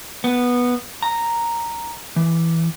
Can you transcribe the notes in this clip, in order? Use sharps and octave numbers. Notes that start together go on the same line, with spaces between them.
B3
A#5
E3